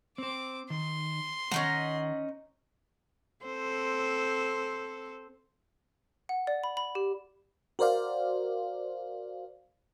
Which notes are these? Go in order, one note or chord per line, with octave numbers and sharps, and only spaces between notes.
C4 C5 D6
D#3 C6
D#3 C#4 D#4 F#5 A#5
C4 A4 C5
F#5
D5
B5
B5
G4
F#4 A#4 C5 D5 F5